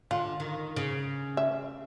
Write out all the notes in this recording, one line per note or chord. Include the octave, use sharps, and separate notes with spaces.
D3 F4
D#3
C#3
E5